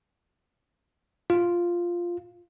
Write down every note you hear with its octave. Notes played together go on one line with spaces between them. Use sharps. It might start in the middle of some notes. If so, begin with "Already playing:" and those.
F4